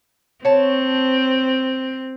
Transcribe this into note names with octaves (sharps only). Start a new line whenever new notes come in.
C4 C#5 A5